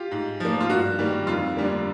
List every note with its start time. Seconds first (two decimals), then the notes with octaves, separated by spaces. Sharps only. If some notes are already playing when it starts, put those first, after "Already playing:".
Already playing: F4 G4
0.11 G#2
0.40 F3 A#3
0.60 F4
0.69 G2 F#4
0.98 D#3 G3 A#3
1.27 F2 F4
1.57 D3 G3 A#3